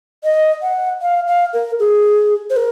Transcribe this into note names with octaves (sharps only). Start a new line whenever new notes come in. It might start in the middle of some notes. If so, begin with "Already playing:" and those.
D#5
F#5
F5
F5
A#4
G#4
C5
A#4